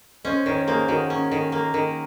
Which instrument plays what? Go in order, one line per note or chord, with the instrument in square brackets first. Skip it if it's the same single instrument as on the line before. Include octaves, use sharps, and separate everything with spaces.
[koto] C#4 [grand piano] C5 D#5
[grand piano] C5
[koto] D#3 [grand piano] A#4 C#5
[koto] A#3 [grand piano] G#4 C5
[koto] D#3 [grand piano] F#4 A#4
[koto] C#4
D#3
A#3
D#3